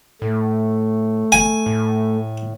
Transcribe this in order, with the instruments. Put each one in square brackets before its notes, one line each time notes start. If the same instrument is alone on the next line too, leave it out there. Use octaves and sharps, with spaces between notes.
[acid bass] A2 [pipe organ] A3
[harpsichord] G#5
[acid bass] A2